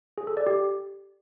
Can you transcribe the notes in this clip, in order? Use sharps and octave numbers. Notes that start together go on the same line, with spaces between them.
G#4
A4
D5
G4